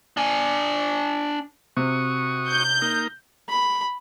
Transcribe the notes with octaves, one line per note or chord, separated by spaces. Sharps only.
D4 G#5
C3 F#4 C#6 D#6
G6
A#3 D#4 A#4
B5